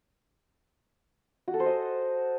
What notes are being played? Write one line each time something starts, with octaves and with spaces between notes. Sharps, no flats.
F#4
A4
C5
D#5